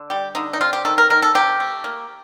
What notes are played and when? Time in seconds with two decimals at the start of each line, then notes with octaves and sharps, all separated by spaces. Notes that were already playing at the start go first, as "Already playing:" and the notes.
Already playing: D3
0.10 G3 G4
0.35 D3 D#4
0.53 D#4
0.61 C4 F4
0.73 G4
0.85 D#3 A4
0.98 A#4
1.10 D#3 A#4
1.22 A4
1.35 C3 G4
1.60 A3
1.84 A#3